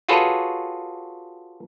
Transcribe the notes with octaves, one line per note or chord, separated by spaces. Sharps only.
F4 F#4 G#4 A4 B4 C#5